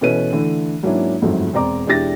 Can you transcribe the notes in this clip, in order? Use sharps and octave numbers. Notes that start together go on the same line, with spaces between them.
B2 E3 C#4 A4 B4 D#7
D3 E3 A3
G#2 F#3 A#3 C#4 D4 E4
G1 F2 G#2 F#3 A3
E1 C4 D5 A#5 D6
E1 D4 E4 G4 A6 A#6